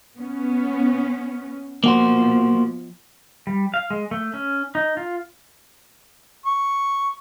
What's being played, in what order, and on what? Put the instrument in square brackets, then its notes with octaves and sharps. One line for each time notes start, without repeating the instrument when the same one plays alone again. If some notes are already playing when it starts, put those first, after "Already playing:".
[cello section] B3 C#4
[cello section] B2 F3 [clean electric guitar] A#3 F#4 C5
[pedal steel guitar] G3
F5
G#3
A3
C#4
D#4
F4
[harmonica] C#6